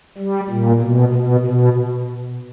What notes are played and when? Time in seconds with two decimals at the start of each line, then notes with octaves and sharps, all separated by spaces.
0.18 G3
0.49 A#2
0.82 B2
1.14 B2
1.46 B2